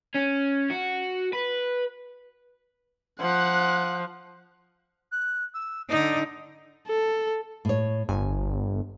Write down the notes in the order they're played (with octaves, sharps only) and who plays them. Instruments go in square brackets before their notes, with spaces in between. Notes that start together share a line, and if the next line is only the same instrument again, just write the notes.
[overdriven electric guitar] C#4
F#4
B4
[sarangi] F3 [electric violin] F#5 F#6
[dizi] F#6
E6
[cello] D3 D#4 [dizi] D5
[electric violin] A4
[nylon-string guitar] A2 C#5
[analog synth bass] G1 [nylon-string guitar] G#5